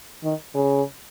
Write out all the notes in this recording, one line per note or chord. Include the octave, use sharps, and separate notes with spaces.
D#3
C#3